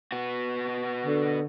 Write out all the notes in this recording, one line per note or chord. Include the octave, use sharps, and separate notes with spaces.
B3 F#4
D3